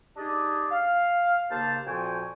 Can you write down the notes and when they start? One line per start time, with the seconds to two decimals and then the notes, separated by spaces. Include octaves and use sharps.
0.17 D4 D#4 G4 G#4 D5 D#5
0.70 F5
1.51 D#2 C#3 A#3 C5 A5
1.87 F2 A#2 F3 F#4 G5 G#5